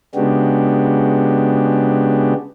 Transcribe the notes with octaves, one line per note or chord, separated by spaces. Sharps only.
C#3 G#3 B3 D4 F#4 G4